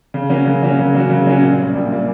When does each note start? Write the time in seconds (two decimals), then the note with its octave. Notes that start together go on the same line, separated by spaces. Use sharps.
0.14 C#3
0.30 F#3 A#3 C#4 F#4
0.46 C#3
0.62 F#3 A#3 C#4 F#4
0.78 C#3
0.95 F#3 A#3 C#4 F#4
1.10 C#3
1.27 F#3 A#3 C#4 F#4
1.43 A#1
1.59 A#2 G3 A#3
1.75 A#1
1.91 A#2 G3 A#3